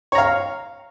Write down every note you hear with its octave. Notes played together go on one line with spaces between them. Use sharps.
C#5 F5 A#5